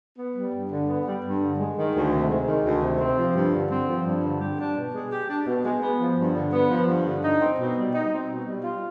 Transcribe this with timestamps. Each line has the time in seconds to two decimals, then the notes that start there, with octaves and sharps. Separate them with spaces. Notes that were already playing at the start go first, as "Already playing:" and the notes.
0.19 B3
0.36 G3
0.53 G2
0.70 D3
0.89 B3
1.06 G3
1.24 G2
1.41 D3
1.59 G#3
1.77 D#3
1.95 D2
2.12 C3
2.30 G#3
2.47 D#3
2.65 D2
2.82 C3
3.00 C4
3.17 F3
3.35 G2
3.53 D3
3.70 C4
3.88 F3
4.06 G2
4.23 D3
4.41 G4
4.59 D4
4.77 B2
4.93 G#3
5.12 G4
5.29 D4
5.47 B2
5.65 G#3
5.82 B3
5.99 F3
6.18 G2
6.35 D3
6.53 B3
6.70 F3
6.88 G2
7.05 D3
7.23 D#4
7.40 C4
7.58 B2
7.76 G3
7.94 D#4
8.11 C4
8.28 B2
8.46 G3
8.64 F4